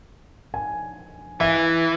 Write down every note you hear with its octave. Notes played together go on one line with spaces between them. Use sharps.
G#5
E3 E5